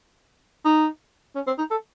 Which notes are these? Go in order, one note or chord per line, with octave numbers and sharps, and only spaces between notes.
D#4
C#4
C4
D#4
A4